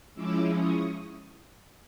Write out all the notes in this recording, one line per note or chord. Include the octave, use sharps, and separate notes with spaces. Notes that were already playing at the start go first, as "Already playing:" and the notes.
F3 G#3 C#4 E4 D6 E6
C#6 D#6